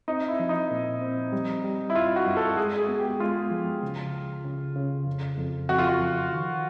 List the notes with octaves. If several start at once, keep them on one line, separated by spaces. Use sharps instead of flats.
C4 D#4
E4
F3
D#4
A#2
C4
G3
G3
E4
G2 F4
F#4
G2
A4
G#3 G#4
G#4
B3
G4
G#3 F4
F3
C#3
C#2
C#3
C#3
F2
F2
F2 F#4
F4
F#4
F3
D#3